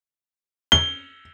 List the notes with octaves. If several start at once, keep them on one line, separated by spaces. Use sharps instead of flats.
G7